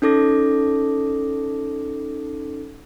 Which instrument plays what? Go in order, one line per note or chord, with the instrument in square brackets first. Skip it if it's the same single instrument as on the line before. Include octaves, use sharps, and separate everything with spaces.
[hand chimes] C#4 D#4 A4 D6 A#6